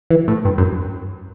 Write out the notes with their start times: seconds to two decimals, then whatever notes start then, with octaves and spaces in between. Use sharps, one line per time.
0.10 E3
0.28 A2
0.45 G2
0.58 F#2